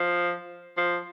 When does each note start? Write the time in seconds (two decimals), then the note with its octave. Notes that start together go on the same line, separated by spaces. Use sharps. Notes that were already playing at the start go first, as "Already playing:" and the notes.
Already playing: F3
0.77 F3